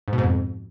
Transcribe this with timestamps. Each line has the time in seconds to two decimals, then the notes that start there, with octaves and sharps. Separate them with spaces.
0.08 G#2
0.13 B2
0.18 G#2
0.23 F2